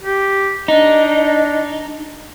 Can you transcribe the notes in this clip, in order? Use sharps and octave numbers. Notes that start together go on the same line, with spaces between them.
G4
D4 D#4